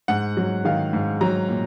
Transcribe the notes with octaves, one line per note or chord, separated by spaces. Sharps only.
G#2 F#5
F#3
D#3 F5
G#2
F#3 A#5
A#2